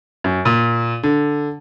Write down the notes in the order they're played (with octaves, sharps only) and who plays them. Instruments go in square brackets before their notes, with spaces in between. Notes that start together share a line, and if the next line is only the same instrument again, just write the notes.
[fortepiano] F#2
A#2
D3